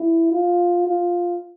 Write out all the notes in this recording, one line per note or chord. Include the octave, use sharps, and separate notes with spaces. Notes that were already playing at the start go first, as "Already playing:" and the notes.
Already playing: E4
F4
F4